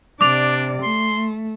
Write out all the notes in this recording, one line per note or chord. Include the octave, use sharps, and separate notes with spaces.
C3 D4 D5 D6 F7
A3 C6